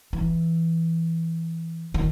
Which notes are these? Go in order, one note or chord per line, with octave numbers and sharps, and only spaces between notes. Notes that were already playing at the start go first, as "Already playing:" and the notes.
E3
D#3